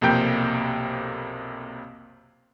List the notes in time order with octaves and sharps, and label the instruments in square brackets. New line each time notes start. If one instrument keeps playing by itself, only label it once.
[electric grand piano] B1 F2 C3 A#3 G5 G6